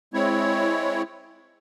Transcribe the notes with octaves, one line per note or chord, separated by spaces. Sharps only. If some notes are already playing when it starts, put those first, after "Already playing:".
G#3 C4 E4 C#5